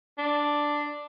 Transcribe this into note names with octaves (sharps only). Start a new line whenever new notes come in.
D4